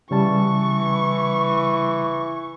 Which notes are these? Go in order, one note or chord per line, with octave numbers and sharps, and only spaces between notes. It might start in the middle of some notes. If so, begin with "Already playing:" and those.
C#3 E3 G3 A5 C#6